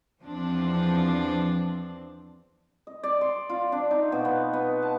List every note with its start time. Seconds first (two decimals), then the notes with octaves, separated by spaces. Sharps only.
0.20 E2 F3 C4 D4
2.87 D#5
3.03 D5
3.21 C6
3.49 F4
3.72 D4
3.91 D#4
4.12 B2
4.25 B3
4.53 B3
4.82 A5